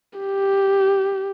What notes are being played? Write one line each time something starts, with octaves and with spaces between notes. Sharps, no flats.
G4